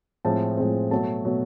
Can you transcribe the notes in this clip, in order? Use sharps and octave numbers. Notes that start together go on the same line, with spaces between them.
A2 F3 G#3 C4 A5
A2 F3 G#3 C4
B2 F#3 A3 A5
B2 F#3 A3